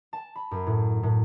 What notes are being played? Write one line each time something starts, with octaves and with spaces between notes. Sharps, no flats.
A5
B5
F#2
A2
A2